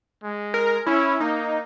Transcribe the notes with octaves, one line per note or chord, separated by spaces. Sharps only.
G#3
A#4
C#4 E4
A#3 D#4